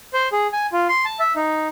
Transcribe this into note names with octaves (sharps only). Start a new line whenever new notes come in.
C5
G#4
G#5
F4
C6
A5
E5
D#4